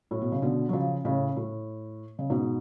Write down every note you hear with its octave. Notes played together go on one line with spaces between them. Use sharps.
A2
B2
C#3
B2 D3
F#3
C#3 F3
A2 C#3
A2
C#3
G#2 B2